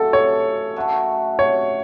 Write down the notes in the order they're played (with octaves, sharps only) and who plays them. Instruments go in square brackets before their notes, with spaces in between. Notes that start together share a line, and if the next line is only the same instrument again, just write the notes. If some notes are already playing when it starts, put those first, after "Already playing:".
Already playing: [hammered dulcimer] C#3 A3 F#4 [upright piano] A4
[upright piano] C#5
[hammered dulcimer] F#2 F#3 A3 F#4
[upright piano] C#5